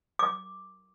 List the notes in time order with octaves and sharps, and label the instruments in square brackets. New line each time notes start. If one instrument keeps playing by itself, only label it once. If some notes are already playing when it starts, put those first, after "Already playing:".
[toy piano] D6